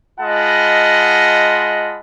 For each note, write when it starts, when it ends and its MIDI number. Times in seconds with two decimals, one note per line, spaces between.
0.20 2.00 56
0.20 2.00 65
0.20 2.00 75
0.20 2.00 78
0.20 2.00 81
0.20 2.00 83